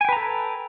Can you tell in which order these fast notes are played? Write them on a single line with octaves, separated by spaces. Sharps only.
G#5 G5 B4 A#5 A4